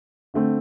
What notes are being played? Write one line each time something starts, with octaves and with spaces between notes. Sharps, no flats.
D3 A3 C4